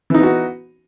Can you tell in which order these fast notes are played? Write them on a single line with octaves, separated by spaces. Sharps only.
E3 D#4 B3 F#4